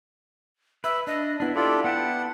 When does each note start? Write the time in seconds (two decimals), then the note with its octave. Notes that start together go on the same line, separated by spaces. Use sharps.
0.84 B4 E5
1.07 D4 D#5
1.40 B3 D4 E4
1.56 D4 F4 G4 A4 D5
1.84 B3 F#5 G5 A5